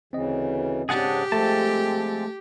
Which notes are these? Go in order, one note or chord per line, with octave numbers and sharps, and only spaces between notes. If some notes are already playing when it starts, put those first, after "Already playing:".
D2 C#3 E3 C4 D#5
G#2 C#3 D4 G4 G#4 F#5 A5
F3 G#3 A3 C4 A4 A5